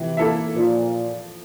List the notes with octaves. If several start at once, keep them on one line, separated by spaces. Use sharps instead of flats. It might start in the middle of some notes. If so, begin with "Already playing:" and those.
Already playing: C3 E3
A#3 E4 A4 E5
A#2 F3